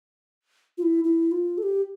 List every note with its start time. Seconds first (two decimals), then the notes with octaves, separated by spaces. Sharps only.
0.78 F4
0.82 E4
1.04 E4
1.32 F4
1.58 A4
1.63 G4